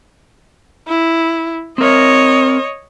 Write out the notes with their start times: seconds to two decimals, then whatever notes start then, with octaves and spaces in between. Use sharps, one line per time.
0.88 E4
1.78 C4 A#4 C#5 D#5